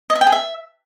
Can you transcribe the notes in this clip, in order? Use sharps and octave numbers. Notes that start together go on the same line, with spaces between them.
D#5
E5
G5
G#4
E5